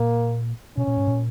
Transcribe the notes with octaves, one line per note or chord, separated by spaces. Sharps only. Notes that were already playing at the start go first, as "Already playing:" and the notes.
Already playing: A#2 A#3
B2 C#4
A#2
G#2
A#2